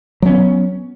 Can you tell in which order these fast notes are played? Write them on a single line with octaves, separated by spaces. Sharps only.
F#3 C#4 B3